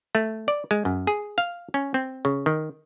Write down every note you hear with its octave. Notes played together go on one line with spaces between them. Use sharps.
A3
D5
G#3
F#2
G#4
F5
C#4
C4
C#3
D#3